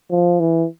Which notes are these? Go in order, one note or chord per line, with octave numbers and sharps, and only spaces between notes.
F3
E3